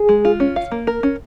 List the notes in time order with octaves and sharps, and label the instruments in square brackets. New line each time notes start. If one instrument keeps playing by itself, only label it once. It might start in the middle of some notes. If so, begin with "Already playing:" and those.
Already playing: [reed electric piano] G#4
[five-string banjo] G#3
F4
C#4
F5
A#3
A#4
C#4